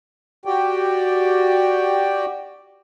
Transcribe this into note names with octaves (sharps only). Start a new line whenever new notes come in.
F#4 G4 D5 G5